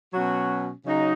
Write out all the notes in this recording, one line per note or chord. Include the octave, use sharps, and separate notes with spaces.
B2 F#3 C#4 F#4
C#3 F#3 D#4 F#4